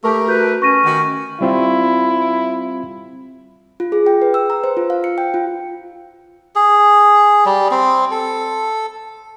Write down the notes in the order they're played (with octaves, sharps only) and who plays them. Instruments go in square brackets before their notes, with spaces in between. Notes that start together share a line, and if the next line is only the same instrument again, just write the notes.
[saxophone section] A3 A#4 [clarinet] G4 [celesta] A5 C#6
[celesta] F#4 G6 [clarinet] B4
[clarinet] C#4 [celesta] C#6 A#6 D#7
[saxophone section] D#3 F#4
[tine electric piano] G3 C4 F4 [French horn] E4
[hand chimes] F4
G#4
G5
B4
E6
A#5
C5
F4
F5
C#7
G5
F4
[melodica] G#4
G3
C4
A4